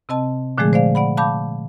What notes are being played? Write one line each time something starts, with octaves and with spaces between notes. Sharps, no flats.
C3 C4 D#5 A5
A#2 D3 F3 G#3 A3 G#4
C5 D5 F5
D5 F#5 B5
F5 A5 B5 D6 G6